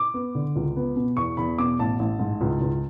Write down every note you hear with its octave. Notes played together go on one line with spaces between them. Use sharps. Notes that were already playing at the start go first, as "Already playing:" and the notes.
Already playing: D6
B3
D3
C#2
B3
B2
E2 C#6
E2 B5
B2 D6
A1 A5
A1
G#2
C#2
C#2